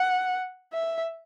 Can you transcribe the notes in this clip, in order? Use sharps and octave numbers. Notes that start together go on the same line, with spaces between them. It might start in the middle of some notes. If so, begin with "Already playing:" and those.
Already playing: F#5
E5